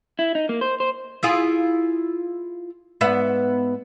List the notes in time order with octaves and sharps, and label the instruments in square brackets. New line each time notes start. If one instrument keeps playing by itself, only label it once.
[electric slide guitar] E4
D#4
A#3
C5
C5
[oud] E4 F4 G#4
G#2 B3 E5